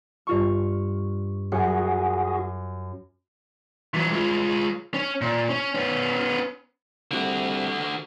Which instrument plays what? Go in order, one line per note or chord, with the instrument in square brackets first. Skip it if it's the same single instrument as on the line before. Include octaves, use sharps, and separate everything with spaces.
[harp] G2 F4 C#6
[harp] F#2 F#6 C#7 [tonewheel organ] F#4 G#4
[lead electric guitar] E3 F#3
G#3 F4
C#4
A#2
C#4
B3 C#4
[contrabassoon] C2 [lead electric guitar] D3 F#4